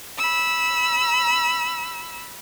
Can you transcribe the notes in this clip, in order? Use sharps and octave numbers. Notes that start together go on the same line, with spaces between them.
B5 E6